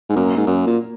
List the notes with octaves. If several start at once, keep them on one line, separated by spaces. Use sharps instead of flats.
G#2
F#2 A#3
G#2
F#2
A#2